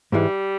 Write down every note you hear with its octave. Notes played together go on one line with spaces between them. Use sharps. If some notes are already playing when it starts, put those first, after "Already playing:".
G#2 E3 G3 G#3